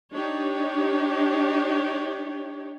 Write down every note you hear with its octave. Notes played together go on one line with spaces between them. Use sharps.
D4 D#4 G4 C#5